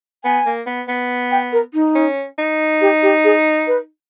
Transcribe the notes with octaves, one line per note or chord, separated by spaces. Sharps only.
B3 G#5
A#3
B3
B3
G5
A#4
D#4
C#4
D#4
G4
G4
G#4
B4